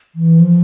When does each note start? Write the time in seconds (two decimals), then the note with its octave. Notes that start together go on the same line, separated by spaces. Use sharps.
0.16 E3
0.40 F3